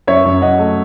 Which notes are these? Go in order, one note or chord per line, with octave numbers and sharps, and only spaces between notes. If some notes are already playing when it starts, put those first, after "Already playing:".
F#2 C#5 E5
F#2
F#2 D#5 F#5
A3